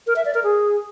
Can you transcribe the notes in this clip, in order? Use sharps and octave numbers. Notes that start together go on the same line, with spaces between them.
A#4
E5
D5
A#4
G#4